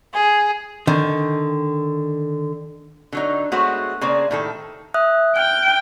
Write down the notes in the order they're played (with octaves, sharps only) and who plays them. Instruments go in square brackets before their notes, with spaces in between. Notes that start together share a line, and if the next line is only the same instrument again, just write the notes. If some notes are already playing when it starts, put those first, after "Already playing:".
[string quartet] G#4
[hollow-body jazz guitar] D3 D#3
[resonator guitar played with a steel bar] D3 F#3 D#4
G#3 A3 B3 F#4 C5 C#5
C#3 A#3 C5 D5
A2 D#3 A4
[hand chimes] E5 D#6 F#6
[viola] G5 [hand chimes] F6 F#6